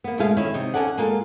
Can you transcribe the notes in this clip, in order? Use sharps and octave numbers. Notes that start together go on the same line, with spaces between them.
A#3 B3
B2 G#3 A3 F4 F5
D#3 C#4 E4
C3 D#4
D#2 C#4 A4 D5 F#5
G#3 A#3 F4 A4